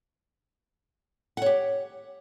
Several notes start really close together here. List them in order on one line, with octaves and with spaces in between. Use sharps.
F#5 C#5 G4